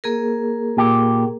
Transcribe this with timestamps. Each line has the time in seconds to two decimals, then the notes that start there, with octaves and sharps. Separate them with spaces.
0.04 A#3 G#4 A#4
0.77 A#2 G4